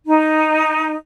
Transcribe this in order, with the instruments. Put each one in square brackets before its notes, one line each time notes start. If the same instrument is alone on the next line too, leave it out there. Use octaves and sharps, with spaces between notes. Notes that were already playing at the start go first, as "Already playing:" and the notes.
[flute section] D#4